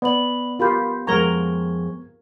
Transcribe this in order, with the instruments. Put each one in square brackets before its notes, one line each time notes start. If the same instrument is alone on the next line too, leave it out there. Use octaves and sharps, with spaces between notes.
[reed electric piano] B3 [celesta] D5 B5 F#7
[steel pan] F4 G4 [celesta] A#4 B5 G6
[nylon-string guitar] F2 G#3 F#5 [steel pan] A#4 A#5 [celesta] C#6 G#6 G7